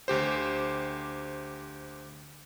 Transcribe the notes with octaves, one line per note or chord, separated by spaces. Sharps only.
D2 G4 C5